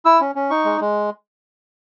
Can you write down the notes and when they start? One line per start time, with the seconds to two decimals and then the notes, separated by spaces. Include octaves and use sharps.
0.05 E4 E6
0.21 C#4
0.35 C#4
0.50 D#4 C#6
0.65 G#3
0.80 G#3